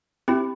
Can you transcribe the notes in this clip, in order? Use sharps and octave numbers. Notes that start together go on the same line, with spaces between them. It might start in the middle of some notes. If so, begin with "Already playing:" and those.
C4 E4 G4